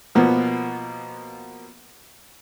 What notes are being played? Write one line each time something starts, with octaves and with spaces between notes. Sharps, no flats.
B2 F3 A#3 B3